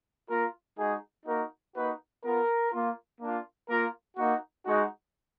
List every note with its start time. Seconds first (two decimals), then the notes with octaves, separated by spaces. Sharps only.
0.29 A#3 F4 A#4
0.78 G#3 D#4 F#4 G#4
1.26 A#3 D#4 F#4 A#4
1.74 A#3 D#4 F#4 B4
2.24 B3 F4 A#4
2.72 A#3 F4
3.20 A#3 D4 F4
3.69 A#3 F4 A#4
4.17 A#3 D#4 F#4
4.66 G#3 D#4 F#4